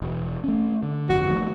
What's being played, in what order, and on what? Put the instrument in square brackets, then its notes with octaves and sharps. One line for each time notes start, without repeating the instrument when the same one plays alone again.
[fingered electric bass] E1
A3 C#4
D3
[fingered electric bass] G1 F2 [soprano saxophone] F#4
[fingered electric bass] D#3 F3 A3